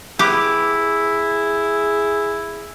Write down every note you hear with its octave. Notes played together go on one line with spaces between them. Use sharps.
B3 E4 G4 G#4 D6